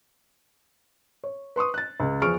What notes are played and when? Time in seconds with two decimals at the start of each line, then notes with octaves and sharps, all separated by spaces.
1.24 C#5
1.56 B4 C6 C#6 D#6
1.74 F#6 A6
2.00 C#2
2.21 E2 F3 G#4 C#6 F6 D7